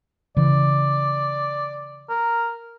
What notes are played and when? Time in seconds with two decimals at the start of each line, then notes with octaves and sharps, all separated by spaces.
0.37 C#3 E3 D5
2.09 A#4